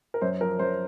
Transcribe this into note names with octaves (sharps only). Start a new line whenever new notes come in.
A#4
F#2 C5
F3 A#4
F#2 C5